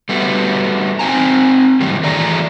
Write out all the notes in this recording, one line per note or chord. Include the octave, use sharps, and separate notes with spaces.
G3 A3 B3 F#4
C4 D#4 G5 G#5 A#5
F#2 A2 D#3 G3
E3 A3 F#4 G#4 D5 A#5